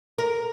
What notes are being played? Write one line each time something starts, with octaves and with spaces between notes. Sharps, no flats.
A#4